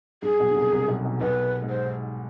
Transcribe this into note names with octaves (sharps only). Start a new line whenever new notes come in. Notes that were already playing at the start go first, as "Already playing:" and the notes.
G2 G#4
B1 B2
D3
C2 C3
C2 C3
B1 B2
B1 B2
B1 B2 B4
G#2
C5